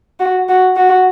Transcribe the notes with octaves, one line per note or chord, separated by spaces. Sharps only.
F#4
F#4
F#4